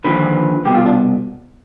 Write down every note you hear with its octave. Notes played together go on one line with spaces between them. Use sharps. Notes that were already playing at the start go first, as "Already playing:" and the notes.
D#2 D3 F3 B4
C2 B2 G4
F4
D4